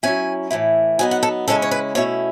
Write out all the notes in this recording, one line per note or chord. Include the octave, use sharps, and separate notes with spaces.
F#3 C#4 E4 G#5
A2 E3 A3 E4
F#3 B3 D#4 G#5
F#5
A4
C#3 E3 G#3 C#4 E4 A4
C#5
B4
B2 A3 C#4 E4 C#5